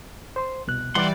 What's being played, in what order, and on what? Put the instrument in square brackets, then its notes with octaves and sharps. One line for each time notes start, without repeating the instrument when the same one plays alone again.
[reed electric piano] C5 C6
C2 B2 F#6
[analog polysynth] E3 G3 D5 [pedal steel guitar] F#5 C6